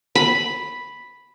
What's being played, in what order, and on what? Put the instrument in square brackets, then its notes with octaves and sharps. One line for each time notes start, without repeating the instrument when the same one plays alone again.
[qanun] B5